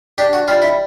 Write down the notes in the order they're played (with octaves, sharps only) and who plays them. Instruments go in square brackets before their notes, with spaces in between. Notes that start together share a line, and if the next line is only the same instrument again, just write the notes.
[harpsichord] D4 G4
F#4
G3 F4
E4